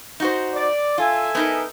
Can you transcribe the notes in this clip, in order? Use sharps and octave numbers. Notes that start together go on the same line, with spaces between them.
D#4 F#4 C5
D5
F4 A4 E5 G#5
B3 D#4 A#4